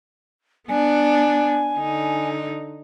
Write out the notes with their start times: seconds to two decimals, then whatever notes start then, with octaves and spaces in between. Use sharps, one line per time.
0.69 B3 D4 G#5
1.76 D3 D#4